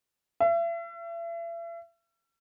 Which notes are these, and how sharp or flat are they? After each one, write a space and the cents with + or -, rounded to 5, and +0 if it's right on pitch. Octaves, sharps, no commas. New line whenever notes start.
E5 +40